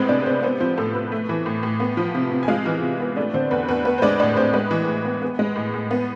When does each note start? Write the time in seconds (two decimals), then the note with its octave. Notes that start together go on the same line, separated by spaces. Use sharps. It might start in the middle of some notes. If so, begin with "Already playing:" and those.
Already playing: A2 G#3 B3 C4 B4 C5
0.09 C3 D4 D5
0.20 B4
0.26 C3 C4 C5
0.43 B3 C4 C5
0.60 F3 C4 C5
0.78 A2 A4
0.94 A2 B4
1.12 A3
1.29 E3
1.46 A2
1.63 A2
1.80 B3
1.97 F3
2.15 C3
2.32 C3
2.43 G#5
2.48 G#3 F4 F5
2.66 E3
2.82 C3
3.00 B3
3.17 A3 D4 D5
3.34 D3 C4 C5
3.51 E2 B4
3.68 E2 B4
3.85 B3 B4
3.98 C5
4.02 G#3 D4 D5
4.20 A2 D4 D5
4.37 A2 C4 C5
4.53 G#3 B4
4.71 E3
4.87 A2
5.05 B3
5.22 B3
5.39 G#3
5.56 A2
5.74 A2
5.91 B3